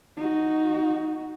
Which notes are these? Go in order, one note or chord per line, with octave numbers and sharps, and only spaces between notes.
D#4 F#4